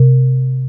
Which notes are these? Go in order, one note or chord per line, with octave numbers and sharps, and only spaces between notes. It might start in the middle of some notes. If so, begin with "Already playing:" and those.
Already playing: C3